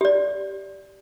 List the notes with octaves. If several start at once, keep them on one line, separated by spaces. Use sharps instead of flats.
G4 D5